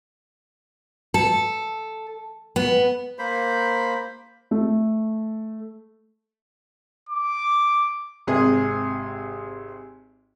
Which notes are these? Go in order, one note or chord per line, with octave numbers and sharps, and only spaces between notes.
A4
B3
A#3 C5 B5
A3
D6
G#1 C3 G#4